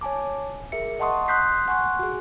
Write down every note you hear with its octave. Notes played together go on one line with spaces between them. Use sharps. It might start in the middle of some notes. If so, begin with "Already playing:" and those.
C#5 G#5 A5 D6
G#4 A#4 E5 C#7
D#5 F#5 A5 C6 C#6 D#6
C6 D#6 F#6 G6 B6 C7
F#5 G#5 C6 C#6 F#6
F#4 G#4